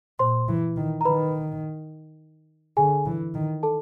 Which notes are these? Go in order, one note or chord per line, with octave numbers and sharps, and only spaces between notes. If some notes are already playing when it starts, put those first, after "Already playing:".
A#2 C5 C6
E3
D#3
A#5
D#3 B4 B5
D3 G#4 G#5
E3
D#3
A4 A5